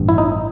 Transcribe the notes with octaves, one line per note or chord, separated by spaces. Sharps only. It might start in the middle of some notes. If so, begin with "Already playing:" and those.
Already playing: A1 G2
E4
D#4